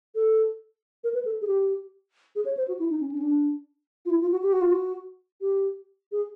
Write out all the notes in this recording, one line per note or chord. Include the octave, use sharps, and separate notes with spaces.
A4
A#4
B4
A4
G#4
G4
G#4
C#5
C5
F#4
E4
D#4
C#4
D4
C#4
D4
F4
E4
F4
F#4
G4
F#4
F4
F#4
G4
G#4